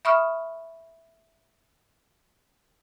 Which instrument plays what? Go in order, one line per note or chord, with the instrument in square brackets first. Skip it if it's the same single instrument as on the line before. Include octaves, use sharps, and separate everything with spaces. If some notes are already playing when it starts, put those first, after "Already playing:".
[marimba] E5 B5 C#6 D#6 F6